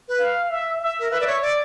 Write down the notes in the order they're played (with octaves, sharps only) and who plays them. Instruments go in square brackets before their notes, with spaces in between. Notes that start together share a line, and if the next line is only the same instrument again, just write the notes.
[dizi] B4
[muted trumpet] F5
E5
E5
[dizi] A#4
[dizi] B4 [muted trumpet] E5
[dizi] D5
C#5
D5